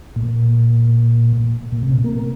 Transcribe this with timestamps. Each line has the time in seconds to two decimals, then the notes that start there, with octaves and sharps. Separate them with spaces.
0.16 A#2
1.72 A#2
1.83 C3
2.04 A#3